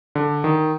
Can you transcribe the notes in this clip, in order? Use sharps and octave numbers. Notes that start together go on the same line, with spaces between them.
D3
D#3